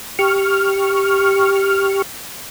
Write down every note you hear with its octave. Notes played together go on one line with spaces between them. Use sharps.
G4 C#6 F6